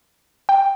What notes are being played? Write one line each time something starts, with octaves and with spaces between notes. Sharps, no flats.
G5